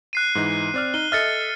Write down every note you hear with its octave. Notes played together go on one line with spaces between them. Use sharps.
F#6 C7 D#7
G#2 E3 D#4
C4 D5 F6
D#4 D#7 G7
A4 D#5 E5 F6 A6 C#7